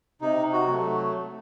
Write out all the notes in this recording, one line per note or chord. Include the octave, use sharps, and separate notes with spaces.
C3 D#4
F#4
F#3 A3